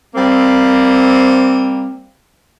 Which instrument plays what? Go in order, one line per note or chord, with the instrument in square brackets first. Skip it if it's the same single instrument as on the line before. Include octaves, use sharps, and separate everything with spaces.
[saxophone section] G3 A#3 C4